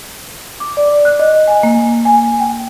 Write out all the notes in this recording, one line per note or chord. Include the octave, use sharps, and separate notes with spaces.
D6
D5
F#6
D#5
G#5
A#3
G#5
G5